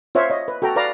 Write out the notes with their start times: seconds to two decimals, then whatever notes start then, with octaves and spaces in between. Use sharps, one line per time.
0.15 F4 C5 C#5 E5 F5
0.30 C#5 D#5
0.48 B4
0.62 F#4 A4 G5 A#5
0.76 B4 D5 F5 A#5 D6